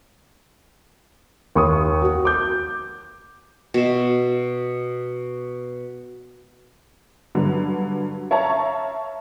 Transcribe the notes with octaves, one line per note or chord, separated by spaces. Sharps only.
D#2 C#6 D#6
F#4
D6 G6
B2 E5
G2 D3 F#3
C#5 E5 F5 A5 A#5 C#6